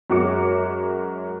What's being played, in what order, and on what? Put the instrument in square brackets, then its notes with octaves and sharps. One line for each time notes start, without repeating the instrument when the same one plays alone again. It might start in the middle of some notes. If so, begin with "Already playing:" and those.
[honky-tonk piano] F#2 G#3 F#4 C#5 D6 C#7